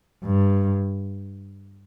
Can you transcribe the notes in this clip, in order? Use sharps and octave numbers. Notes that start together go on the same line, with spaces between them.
G2